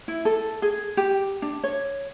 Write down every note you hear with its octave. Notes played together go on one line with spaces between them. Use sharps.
E4
A4
G#4
G4
D4
C#5